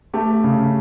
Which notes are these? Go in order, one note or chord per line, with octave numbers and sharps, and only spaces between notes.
A3 G4
C#3